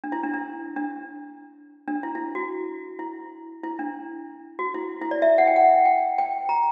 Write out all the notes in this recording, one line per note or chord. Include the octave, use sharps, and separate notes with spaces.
D4
E4
D4
D4
D4
D4
E4
E4
F#4
E4
E4
D4
F#4
E4
E4
D5
E5
F#5
G5
F#5
G5
G5
A#5